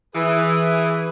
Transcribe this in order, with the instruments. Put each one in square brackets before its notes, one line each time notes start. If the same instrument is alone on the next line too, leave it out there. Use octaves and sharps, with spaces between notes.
[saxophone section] E3 [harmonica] G#4 B4